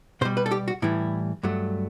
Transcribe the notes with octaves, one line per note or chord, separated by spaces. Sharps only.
B2 G3 C5
B4
A4
G4
F#4
A2 E3 G3 E4
G2 F#3 A3